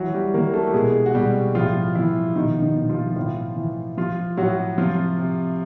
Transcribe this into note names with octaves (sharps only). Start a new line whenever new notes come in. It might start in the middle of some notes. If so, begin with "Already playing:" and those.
Already playing: E3 F#3 F#4
G3 G4
E3 A#3 A#4
A3 A4
G4
B2 G#3 G#4
F#4
B2 G3 G4
A2 F3 F4
E3 F3 E4
B2 D#3 D#4
D#3 D#4
B2
F3 F4
A2 F3 F4
E3
F3 F4
A2 F#3 F#4
C3 F3 F4
C3